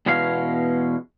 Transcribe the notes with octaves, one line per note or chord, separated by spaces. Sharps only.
E2 B2 G#3 C#4 F5